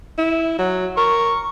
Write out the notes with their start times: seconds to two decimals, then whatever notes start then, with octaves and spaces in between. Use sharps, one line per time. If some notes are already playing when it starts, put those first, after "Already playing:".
0.18 E4
0.59 F#3
0.97 A#4 C#6